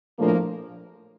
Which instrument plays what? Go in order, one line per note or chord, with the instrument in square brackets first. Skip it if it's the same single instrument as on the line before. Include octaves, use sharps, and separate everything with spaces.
[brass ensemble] A#1 A2 F3 A#3